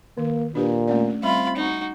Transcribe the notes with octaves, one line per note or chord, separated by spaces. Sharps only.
D#3 A#3
A#2 D4 G4 B4
A3 C#4 D5
G3 C4 F4 E5 B5
D#4 F#4